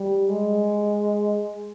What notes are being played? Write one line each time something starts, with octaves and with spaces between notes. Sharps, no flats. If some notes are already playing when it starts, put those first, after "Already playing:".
Already playing: G3
G#3